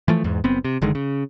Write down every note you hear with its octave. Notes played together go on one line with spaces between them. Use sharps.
E3 F3 A3
E2 G#2
F#1 B3 C4
C3
F#1 D3 D#3 G#3
C#3